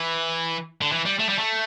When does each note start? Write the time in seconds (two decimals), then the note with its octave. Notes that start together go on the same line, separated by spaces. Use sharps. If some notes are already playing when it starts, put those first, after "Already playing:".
Already playing: E3
0.81 D3
0.92 E3
1.05 G3
1.19 A3
1.29 G3
1.39 A3